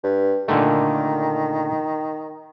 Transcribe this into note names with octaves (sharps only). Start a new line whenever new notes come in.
G2
A#2 D3 D#3 A3